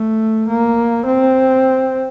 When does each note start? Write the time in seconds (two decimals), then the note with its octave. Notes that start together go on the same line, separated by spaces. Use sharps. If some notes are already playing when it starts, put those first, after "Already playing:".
Already playing: A3
0.48 A#3
1.06 C4